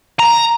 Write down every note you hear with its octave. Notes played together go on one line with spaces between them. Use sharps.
A#5